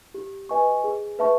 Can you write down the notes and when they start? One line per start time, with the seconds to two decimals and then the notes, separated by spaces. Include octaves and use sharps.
0.14 G4
0.49 B4 D#5 G#5 C#6
0.84 G#4
1.19 B4 E5 A5 C#6